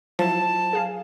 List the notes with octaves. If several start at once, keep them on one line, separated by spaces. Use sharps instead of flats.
F3 F#3 E4 A5
G#4 F5 G#5